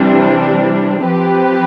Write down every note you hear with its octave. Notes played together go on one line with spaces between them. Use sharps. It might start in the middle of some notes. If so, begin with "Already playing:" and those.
Already playing: C3 E3 G3 D4
F3 C4 G4 B4